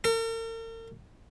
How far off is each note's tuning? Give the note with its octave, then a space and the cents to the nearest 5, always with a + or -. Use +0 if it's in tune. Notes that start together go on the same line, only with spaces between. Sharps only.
A#4 -45